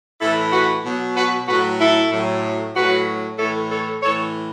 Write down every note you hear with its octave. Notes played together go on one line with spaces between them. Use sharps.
A2 E3 E4 A4
F#4 B4
B2 F#3
F#4 B4
A2 F#3 F#4 B4
E4 A4
A2 F#3
A2 F#3 F#4 B4
A2 E3 A4 C#5
A4 C#5
A2 E3 A4 C#5